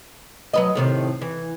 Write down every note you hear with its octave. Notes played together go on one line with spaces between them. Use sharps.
F#3 B4 D#5
A2 C3 D#3
E3